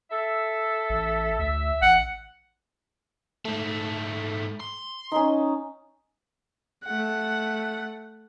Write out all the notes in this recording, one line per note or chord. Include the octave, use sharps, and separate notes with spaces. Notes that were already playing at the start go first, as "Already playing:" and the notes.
A4 E5
A1
D2 E5
A1 F#5
G#2 A3
C6
C#4 D#4
A3 F#5